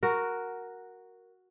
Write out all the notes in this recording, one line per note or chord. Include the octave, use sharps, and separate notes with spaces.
F#4 A#4